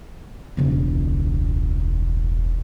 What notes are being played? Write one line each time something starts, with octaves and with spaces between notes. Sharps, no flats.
E1 C#2